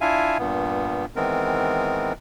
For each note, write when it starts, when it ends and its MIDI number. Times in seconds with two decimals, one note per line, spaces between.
0.01 0.38 62
0.01 0.38 64
0.01 0.38 65
0.01 0.38 76
0.01 0.38 77
0.01 0.38 80
0.39 1.05 43
0.39 1.05 46
0.39 1.05 59
1.16 2.13 51
1.16 2.13 52
1.16 2.13 56
1.16 2.13 59
1.16 2.13 60
1.16 2.13 70